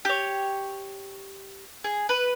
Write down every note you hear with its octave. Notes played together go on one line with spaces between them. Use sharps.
G4 C#5
G#4
B4